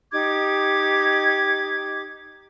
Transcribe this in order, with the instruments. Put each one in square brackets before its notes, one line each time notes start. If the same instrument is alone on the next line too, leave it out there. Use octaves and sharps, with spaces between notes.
[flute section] D#4 G4 D6 G#6